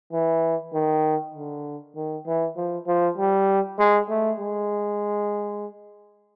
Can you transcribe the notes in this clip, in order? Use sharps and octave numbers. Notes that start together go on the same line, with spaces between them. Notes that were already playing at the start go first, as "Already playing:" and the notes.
E3
D#3
D3
D#3
E3
F3
F3
G3
G#3
A3
G#3